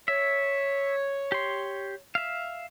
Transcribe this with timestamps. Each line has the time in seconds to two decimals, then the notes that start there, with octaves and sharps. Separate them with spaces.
0.08 C#5 E5
1.32 G4 C6
2.15 E5 F5